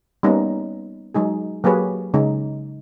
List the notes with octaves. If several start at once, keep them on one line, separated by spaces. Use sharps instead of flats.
G3 A#3 B3 C#4 D#4
F#3 G#3 D#4 G#4
F#3 A#3 G4 G#4 B4 C#5
C#3 G#3 D#4